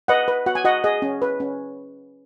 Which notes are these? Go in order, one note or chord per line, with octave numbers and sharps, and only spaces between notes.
B4 D#5 F#5
B4
F#4 F#5
G#5
F#4 D#5 F#5
G#4 D#5
C#4
B4
C#4